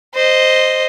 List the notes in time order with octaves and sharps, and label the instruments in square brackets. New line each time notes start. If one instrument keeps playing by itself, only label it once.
[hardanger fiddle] C5 D#5